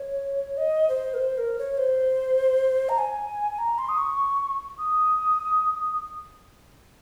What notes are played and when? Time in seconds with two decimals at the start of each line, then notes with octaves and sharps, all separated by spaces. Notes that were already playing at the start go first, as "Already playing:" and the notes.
Already playing: C#5
0.57 D#5
0.89 C5
1.14 A#4
1.17 C5
1.38 A#4
1.59 C#5
1.78 C5
2.89 A#5
2.98 G#5
3.59 A#5
3.78 C6
3.89 D#6
3.98 C#6
4.78 D#6